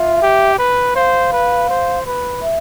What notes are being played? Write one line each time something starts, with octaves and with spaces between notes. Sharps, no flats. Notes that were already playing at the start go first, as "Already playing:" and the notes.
Already playing: F4 E5
G4
B4
C5 F5
B4
C5
B4
E5